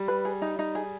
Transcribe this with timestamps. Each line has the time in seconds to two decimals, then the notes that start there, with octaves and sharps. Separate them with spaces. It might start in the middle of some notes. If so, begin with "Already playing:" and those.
Already playing: G3
0.08 B4
0.25 G#4
0.42 D#4
0.59 D#4
0.75 G#4